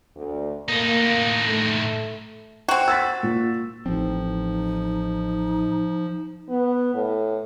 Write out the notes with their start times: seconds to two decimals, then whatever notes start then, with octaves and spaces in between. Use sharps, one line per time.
0.16 D2
0.69 A2 A#3 D#4
1.45 A3
2.68 C4 F#4 G5
2.88 E6 A6 B6
3.23 A#2
3.86 A1 F3 C4 D#4
6.49 B3
6.94 A2